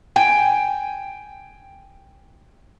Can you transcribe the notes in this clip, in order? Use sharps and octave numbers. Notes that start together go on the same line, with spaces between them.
G5 G#5